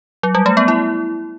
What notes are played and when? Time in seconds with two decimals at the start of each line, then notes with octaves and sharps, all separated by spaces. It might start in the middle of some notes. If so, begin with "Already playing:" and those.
0.23 F#3
0.35 G3
0.46 A3
0.57 B3
0.68 E4